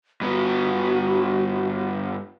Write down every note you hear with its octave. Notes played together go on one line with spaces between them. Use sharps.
G2 B3 F#4